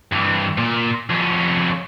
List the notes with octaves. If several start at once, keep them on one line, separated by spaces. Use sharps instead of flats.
G2 E3
A#2
F2 C#4